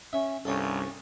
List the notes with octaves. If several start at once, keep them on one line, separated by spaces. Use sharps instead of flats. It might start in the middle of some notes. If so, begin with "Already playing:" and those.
C#4 E5
C2 G2 C#4 A4 C#5